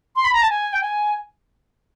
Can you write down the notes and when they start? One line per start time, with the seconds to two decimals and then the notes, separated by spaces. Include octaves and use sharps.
0.16 C6
0.24 B5
0.33 A#5
0.42 A5
0.50 G#5
0.73 G5
0.81 G#5